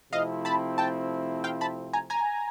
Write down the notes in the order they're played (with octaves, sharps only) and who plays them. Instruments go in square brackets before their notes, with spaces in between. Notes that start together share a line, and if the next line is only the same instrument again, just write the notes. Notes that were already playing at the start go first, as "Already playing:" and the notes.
[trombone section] C3 F3 A3 C4 E4 [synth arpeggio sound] D#5 F5
[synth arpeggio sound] A5 B5
G5 A5
F5 G5
A5 B5
G#5 A#5
G#5 A#5